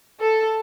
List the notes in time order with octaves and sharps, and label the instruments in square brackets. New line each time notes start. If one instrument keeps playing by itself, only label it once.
[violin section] A4